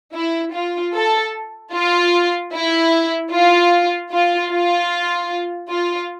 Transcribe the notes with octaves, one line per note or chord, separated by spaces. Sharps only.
E4
F4
A4
F4
E4
F4
F4
F4
F4